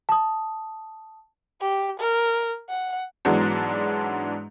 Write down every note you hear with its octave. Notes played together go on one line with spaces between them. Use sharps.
A5 D#6
G4
A#4
F#5
G#2 E3 F#3 G#3 B3 D4